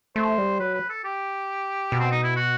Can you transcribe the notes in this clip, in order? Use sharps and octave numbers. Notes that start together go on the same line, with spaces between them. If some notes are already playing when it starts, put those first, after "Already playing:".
A3 C5
G3
F#3 B4
B4
A4
G4
B2
C4
D#4
E4
F#4